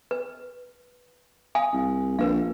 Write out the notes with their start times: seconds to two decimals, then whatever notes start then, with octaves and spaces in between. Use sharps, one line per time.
0.11 B4
1.55 F5 G#5 D#6
1.73 C2
2.19 A#1 A#4 B4 F5